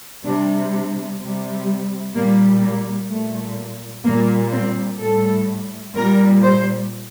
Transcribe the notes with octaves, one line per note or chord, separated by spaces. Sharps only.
C3 G3 D4
D4
C3 G3
A#2 G3 A#3
A#3
A#2 G3 A3
A#2 G3 A#3
C4
A2 G3 A4
A#2 G3 A#4
C5